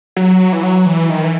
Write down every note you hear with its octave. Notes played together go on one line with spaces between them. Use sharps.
F#3
E3
F#3
E3
D#3
E3